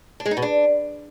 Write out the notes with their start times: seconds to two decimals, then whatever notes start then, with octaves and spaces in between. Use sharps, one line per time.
0.20 D4
0.26 G#3
0.31 D#4
0.37 B2
0.42 D4